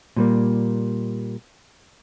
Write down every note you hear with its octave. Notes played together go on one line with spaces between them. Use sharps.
A#2 G3 A#3